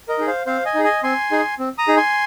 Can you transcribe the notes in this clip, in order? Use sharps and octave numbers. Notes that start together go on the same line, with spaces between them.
A#4 D#5
D#4 G#4
C5 F5
C4 C5 F5
D#5 G#5
D#4 G#4
D#5 G#5
C4 G#5 C6
D#4 G#4
C4
A#5 D#6
D#4 G#4
G#5 C6